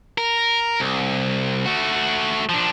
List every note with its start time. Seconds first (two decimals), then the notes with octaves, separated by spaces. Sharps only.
0.18 A#4
0.80 C2
1.66 A3 F#4
2.49 F3 D4